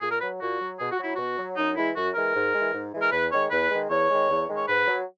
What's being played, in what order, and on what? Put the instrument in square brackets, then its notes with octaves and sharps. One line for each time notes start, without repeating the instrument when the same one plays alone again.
[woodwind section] A#2 G#4
A#4
F#3 B4
A#2 F#4
F#3
B2 G#4
F#4
F#3 E4
B2 F#4
F#3
F#2 D#4
E3 G#3 E4
F#2 F#4
E3 G#3 A#4
G#2
E3 G#3
G#2
E3 G#3
A#4
E2 B4
D#3 G#3 C#5
E2 B4
D#3 G#3
E2 C#5
D#3 G#3
E2
D#3 G#3
C#5
G#2 B4
F#3